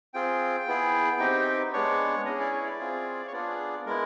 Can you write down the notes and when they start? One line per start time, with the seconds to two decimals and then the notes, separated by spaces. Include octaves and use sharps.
0.14 C4 F4 G#4 G5
0.67 B3 E4 G#4
1.20 C4 D#4 G4
1.73 G#3 B3 D4 C#5
2.26 C#4 E4 G#4 D#5
2.40 D5
2.52 C#5
2.66 D5
2.79 C4 F4 G#4
3.27 C#5
3.32 B3 D4 F4 G#4 D5
3.86 G#3 B3 E4 A#4